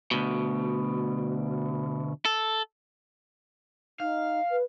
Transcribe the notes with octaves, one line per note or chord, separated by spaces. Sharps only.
D2 B2
A4
D#4 F5
B4